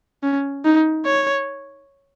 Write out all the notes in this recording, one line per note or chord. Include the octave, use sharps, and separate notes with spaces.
C#4
D#4
C#5